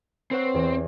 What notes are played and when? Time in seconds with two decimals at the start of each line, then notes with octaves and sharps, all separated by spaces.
0.31 C4 B4 C#5 F#5
0.54 E2 B3 G4